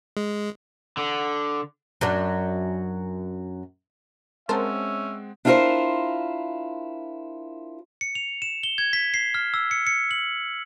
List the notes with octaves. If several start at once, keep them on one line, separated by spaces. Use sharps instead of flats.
G#3
D3
F#2 F#3 D4
G#3 C4 C#4 A#4 C5 E5 F#5 A5
D4 E4 F4 G4 A#4 C5
C#7
F7
E7
G7
G#6
B6
C7
F6
E6
C#7
C#7
F#7